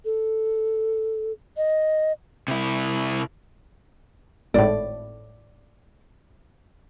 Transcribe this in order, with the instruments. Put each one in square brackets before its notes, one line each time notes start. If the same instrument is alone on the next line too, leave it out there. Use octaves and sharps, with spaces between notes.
[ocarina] A4
D#5
[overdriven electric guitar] C3 E4
[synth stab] G#1 A2 [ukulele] D5